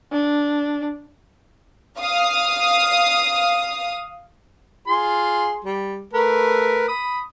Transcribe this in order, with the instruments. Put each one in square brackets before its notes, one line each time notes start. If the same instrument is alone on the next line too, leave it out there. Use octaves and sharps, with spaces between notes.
[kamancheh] D4
[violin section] F5 D#6
[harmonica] F4 G#4 C6
G3
A3 A#4 B4
B5 D#6